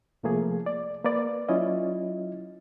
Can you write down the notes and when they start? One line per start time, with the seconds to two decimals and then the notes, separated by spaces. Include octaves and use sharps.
0.23 C2 C3 F3 A3 A#3 G#4
0.66 D5
1.04 A#3 B4 D5
1.49 F#3 C#4 E4 F4 D#5